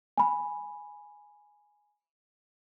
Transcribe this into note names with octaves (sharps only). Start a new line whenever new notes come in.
G#5 B5